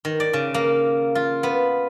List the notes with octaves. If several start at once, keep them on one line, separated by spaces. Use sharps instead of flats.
D#3
D5
C#3
A#3
F4
B3